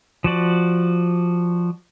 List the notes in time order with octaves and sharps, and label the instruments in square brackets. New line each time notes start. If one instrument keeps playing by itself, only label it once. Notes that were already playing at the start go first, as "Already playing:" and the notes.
[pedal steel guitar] F3 F#4 D5